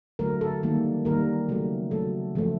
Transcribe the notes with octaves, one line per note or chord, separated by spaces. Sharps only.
D3 F#3 A3 A#4
A4
D#3 G3 A#3
D#3 G3 A#3 A#4
C#3 F#3 A3
C#3 F#3 A3 A4
C#3 F3 A3